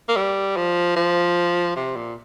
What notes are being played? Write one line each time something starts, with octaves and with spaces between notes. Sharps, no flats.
A#3
G3
F3
F3
C3
A#2